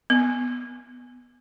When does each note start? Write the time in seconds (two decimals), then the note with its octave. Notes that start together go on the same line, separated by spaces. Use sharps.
0.10 B3